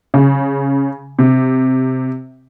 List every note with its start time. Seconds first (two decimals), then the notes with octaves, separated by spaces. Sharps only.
0.14 C#3
1.19 C3